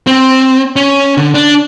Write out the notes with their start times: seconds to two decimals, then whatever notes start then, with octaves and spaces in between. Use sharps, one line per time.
0.07 C4
0.76 C#4
1.17 D3
1.34 D4